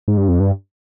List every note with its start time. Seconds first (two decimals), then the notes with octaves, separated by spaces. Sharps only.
0.08 G#2
0.17 G2
0.28 F2
0.40 G2